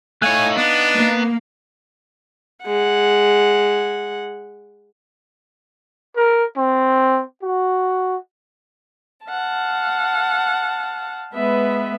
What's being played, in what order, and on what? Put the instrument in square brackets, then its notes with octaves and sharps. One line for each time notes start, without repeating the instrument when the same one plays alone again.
[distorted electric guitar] A3 C#5 [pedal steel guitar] D#4 F5 F#6 [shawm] G#5
[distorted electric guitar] B3 [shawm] D4
[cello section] A#3
[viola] G#3 F#5
[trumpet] A#4
C4
F#4
[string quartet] F5 F#5 A5
G#3 B3 B4 E5